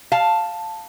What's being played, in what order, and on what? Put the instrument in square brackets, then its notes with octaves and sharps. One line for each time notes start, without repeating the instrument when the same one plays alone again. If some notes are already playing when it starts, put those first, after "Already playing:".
[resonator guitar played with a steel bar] F5 A5